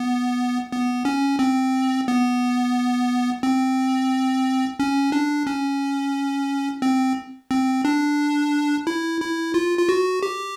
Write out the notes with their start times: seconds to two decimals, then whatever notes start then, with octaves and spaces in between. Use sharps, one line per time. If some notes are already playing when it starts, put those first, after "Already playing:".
Already playing: B3
0.72 B3
1.05 C#4
1.39 C4
2.08 B3
3.43 C4
4.80 C#4
5.12 D4
5.47 C#4
6.82 C4
7.51 C4
7.85 D4
8.87 E4
9.21 E4
9.54 F4
9.78 F4
9.89 F#4
10.23 G4